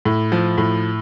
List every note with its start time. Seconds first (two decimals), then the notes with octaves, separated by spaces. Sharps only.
0.05 A2
0.32 F3
0.58 A2